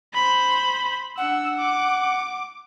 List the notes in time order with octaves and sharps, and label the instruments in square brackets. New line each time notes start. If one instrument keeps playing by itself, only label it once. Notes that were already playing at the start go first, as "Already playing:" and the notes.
[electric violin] C5 B5
[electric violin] D4 E6 [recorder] F#5
[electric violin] D6